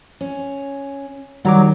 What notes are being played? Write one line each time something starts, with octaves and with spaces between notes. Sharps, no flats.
C#4
D#3 F#3 G3 A#5 D6